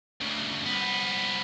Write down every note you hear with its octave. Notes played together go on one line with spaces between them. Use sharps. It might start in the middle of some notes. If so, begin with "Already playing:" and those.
D2 C#3
C2 B3